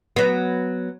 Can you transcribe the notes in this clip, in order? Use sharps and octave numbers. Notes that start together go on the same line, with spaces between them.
F#3 B3